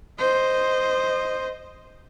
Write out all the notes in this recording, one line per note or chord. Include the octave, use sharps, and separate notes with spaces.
C5 D#5